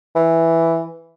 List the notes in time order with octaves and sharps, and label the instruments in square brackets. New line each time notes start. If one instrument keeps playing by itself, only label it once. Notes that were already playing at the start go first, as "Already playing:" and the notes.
[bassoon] E3